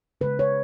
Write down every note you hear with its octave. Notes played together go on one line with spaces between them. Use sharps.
C#3 G#3 B4
C#5